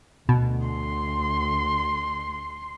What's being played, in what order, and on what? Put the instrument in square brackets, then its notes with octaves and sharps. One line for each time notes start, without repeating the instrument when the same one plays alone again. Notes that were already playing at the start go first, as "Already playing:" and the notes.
[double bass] D2 [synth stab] B2
[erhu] C6